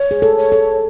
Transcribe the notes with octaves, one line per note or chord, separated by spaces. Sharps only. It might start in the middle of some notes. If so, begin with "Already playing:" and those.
Already playing: C#5
G#4
A4
C#5
A4